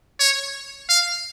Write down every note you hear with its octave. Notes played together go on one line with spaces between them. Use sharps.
C#5
F5